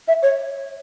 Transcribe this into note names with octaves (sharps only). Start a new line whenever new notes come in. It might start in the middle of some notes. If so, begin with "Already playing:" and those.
E5
C#5